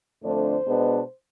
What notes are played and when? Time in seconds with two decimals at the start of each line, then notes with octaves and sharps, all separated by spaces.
0.23 F2 D3 A3 D4 C5
0.66 B2 G#3 B3 D4